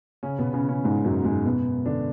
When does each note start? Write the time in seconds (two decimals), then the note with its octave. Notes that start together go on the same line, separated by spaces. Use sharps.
0.23 C#3 C#4
0.39 B2 B3
0.53 C#3 C#4
0.68 C#3 C#4
0.84 G#2 G#3
1.04 F#2 F#3
1.25 G#2 G#3
1.45 B2 B3
1.86 D3 D4